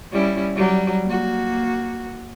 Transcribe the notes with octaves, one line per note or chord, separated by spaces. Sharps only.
G3 C#4 E4
F#3 G3
A#3 F#4